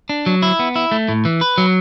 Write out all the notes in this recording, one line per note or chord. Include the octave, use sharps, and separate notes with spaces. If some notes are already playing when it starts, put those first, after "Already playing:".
D4
F#3
E4
B3
E4
A3
A2
E3
B4
F#3